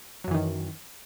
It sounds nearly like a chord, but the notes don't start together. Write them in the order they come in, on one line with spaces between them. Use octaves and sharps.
F#3 F#2 E3 D#3